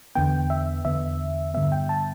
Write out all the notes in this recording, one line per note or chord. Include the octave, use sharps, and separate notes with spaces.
E2 D3 B3 G5
E5
E2 D3 B3 E5
G2 D3 G3 B3 E5
G5
A5